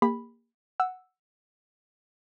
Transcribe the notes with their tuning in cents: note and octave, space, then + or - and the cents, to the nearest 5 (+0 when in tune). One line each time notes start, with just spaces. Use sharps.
A#3 +0 G4 +40 B5 +0
F#5 +0 E6 +0